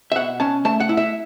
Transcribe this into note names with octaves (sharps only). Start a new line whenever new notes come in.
E5
B2 F#5
C#4 A5
A3 A5
F#5
E4
E5